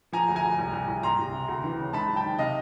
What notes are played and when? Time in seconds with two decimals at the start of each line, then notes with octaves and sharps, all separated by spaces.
0.13 F3 G#5 A#5
0.28 D2
0.36 G#5 A#5
0.44 D2
0.59 C2
0.73 C2
0.88 C2
1.03 C2 A#5 C6
1.19 C2
1.33 C3
1.48 D2
1.64 E3
1.79 C#3
1.93 G#2 A5 B5
2.08 F#3
2.16 G5 A5
2.24 D#3
2.38 C3 D#5 F5